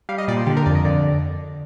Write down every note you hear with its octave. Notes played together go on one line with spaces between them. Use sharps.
G3 F5
D#5
A#2 D5
C5
D3 G4
A#4
F2 D5
D#5
D3 D5